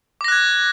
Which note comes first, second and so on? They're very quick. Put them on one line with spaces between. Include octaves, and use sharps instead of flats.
D6 A#6 F#6 G#6